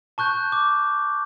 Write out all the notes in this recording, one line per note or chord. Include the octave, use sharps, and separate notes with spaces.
A5 C#6 F#6 G6
D6